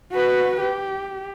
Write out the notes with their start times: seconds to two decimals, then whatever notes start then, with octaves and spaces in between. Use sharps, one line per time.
0.12 F#4 B4
0.60 G4